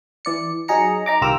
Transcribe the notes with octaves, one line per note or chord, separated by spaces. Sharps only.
E3 D5 C#7
F#3 D#4 G#4 A#5 C#7
D#4 A#5 D6
C2 D#3 F4 G4 A#5 E6